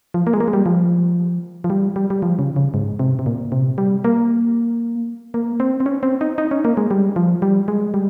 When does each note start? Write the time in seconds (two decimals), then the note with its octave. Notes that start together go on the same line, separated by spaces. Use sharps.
0.14 F3
0.27 A#3
0.33 G#3
0.40 A#3
0.48 G#3
0.53 G3
0.66 F3
1.64 F3
1.70 G3
1.96 G3
2.10 G3
2.22 F3
2.39 C#3
2.56 C#3
2.74 G#2
2.99 C3
3.19 C3
3.26 A#2
3.52 C3
3.78 G3
4.04 A#3
5.34 A#3
5.60 C4
5.80 C4
5.86 C#4
6.03 C4
6.21 D#4
6.38 D#4
6.51 C#4
6.65 A#3
6.77 G#3
6.91 G3
7.16 F3
7.42 G3
7.68 G#3
7.94 G3